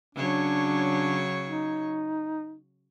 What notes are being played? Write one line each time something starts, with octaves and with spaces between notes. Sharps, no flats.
C#3 F#3 D4 C#5
D#4